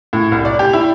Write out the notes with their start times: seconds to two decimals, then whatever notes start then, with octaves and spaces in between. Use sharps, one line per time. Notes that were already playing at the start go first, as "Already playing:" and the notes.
0.13 A2
0.32 C2
0.45 D5
0.59 G4
0.73 E4